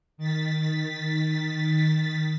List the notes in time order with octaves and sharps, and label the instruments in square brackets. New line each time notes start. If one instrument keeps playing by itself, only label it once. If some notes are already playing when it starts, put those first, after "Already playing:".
[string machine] D#3 A6 B6